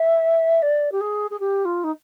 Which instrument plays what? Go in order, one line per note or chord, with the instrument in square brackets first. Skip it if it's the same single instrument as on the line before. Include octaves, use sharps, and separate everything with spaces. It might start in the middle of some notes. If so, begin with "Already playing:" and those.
Already playing: [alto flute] E5
D5
G4
G#4
G#4
G4
F4
D#4